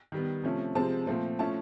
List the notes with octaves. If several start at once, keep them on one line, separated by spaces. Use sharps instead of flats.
D#3 G3 B3
C3 F3 A3 C#4
C3 F3 G#3 C4 A5
A#2 F3 A3 C4
F3 A3 C#4 E4 A5